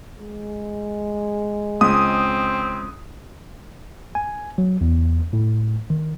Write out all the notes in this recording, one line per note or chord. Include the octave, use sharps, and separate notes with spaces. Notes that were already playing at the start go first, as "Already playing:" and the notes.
G#3
C#2 C4 D#6
G#5
F#3
E2
A2
D#3